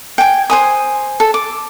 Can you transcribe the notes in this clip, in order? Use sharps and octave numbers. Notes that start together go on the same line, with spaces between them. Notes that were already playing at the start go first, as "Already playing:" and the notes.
G5 G#5
C5 G#5 D#6
A4
D6